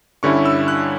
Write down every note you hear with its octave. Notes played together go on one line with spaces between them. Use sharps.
G2 D3 G3 C#4 E4 C#6
E6
F#6